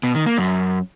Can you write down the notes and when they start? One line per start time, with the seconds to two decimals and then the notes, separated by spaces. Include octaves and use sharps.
0.03 B2
0.15 D#3
0.26 A#3
0.38 F#2